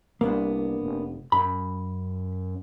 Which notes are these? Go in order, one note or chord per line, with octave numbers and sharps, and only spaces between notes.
C2 A#3 B3 D4
F1
F#2 B5